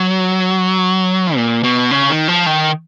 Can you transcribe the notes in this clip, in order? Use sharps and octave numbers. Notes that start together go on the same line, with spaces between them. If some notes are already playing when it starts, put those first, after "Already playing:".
Already playing: F#3
A#2
B2
C#3
D#3
F3
D#3